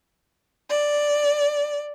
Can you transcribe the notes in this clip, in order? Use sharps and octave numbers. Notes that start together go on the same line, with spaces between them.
D5